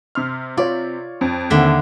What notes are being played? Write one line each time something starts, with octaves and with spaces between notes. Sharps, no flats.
C3 C6 F6
F4 C#5 D5
F2
D#2 D3 E5